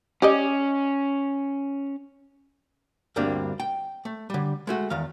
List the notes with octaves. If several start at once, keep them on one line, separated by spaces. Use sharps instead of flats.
C#4 G4 D5 D#5
D2 G2 G3 A#3 C4 D4
G5
A3
D3 G3
G#3 A3 F#4
E2 D#3 F5